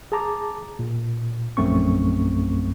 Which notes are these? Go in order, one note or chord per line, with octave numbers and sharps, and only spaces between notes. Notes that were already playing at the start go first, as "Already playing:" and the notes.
G#4 A5 A#5 D6
A#2
A#1 F#2 A3 C4 C#6